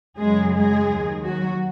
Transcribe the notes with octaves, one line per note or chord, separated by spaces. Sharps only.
F#2 C#3 F#3 G#3 G#4
G#3 G#4
D#2 D#3 F#3
F#3 F#4